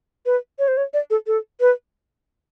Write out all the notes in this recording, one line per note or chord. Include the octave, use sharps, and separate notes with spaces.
B4
C#5
C5
C#5
D5
A4
A4
B4